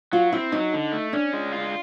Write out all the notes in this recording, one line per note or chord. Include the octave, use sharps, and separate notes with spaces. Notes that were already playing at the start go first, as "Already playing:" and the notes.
F#3 F4
C4 E4
F#3 D#4
D3
A3
C#4 D4
G#3
F4